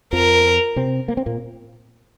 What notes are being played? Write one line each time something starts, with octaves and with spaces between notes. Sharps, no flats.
F2 F3 A#4
C3 C4
A#3
C4
A#2 A#3